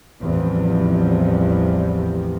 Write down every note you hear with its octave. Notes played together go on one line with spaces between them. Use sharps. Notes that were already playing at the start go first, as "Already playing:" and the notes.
A1 E2 C3 F3 G3